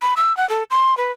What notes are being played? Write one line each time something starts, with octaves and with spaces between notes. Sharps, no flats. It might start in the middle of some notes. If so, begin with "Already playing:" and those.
B5
E6
F#5
A4
C6
B4